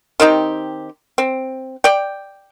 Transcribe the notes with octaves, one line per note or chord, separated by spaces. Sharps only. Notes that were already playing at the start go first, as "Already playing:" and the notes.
D#3 C4 D#4 G4
C4
D5 G5